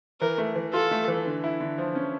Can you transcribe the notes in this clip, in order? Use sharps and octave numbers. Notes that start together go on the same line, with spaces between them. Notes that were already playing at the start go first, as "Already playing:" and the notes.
E3 A#4
A3
E3
F4 A4
A3
E3
D3
E4
D3
F3
C#4